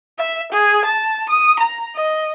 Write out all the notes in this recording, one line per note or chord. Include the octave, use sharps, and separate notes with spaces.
E5
G#4
A5
D#6
A#5
D#5